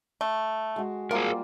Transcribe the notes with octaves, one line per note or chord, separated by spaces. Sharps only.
A3
G#3 F#4
F3 G3 A#3 F4 G#4 A#4